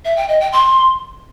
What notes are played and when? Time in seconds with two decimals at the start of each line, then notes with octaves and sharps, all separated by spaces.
0.05 E5
0.17 G5
0.29 D#5
0.40 G5
0.52 C6